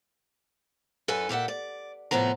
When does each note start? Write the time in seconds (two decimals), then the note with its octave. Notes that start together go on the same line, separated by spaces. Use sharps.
1.08 F#2 A4 B4 G#5
1.29 A#2 G4 E5 F#5
1.48 D5
2.11 A2 C3 F3 B3 A#5